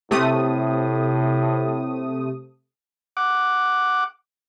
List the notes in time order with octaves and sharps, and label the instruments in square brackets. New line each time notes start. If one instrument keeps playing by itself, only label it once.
[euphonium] A2 [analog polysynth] C3 A3 D#6
[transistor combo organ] F#5 D6